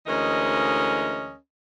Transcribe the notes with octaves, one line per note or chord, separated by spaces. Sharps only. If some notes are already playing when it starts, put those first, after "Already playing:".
D2 E3 G#3 C#4 A#4 D#5